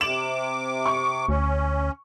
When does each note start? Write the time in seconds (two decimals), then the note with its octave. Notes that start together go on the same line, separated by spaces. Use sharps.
0.01 C3 D6 E7 F#7
0.86 C#6
1.29 D2 C#4